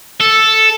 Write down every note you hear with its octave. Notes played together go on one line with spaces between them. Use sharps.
A4